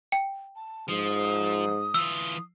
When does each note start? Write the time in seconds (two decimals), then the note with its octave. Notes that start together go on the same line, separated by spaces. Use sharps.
0.12 G5
0.56 A5
0.88 G#2 F3 D#6
1.94 E3 F4 E6